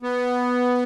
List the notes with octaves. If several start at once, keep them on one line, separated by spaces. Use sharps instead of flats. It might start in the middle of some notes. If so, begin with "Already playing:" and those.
B3